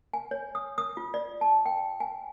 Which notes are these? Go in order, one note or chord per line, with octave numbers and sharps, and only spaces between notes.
G#5
C#5
D#6
D#6
F4
D5
A5
G5
G#5